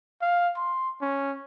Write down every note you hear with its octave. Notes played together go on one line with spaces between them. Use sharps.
F5
C6
C#4